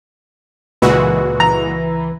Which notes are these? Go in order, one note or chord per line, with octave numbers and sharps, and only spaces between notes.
C#2 A#2 E3 G#3 F#4 B4 E6
E3 A#5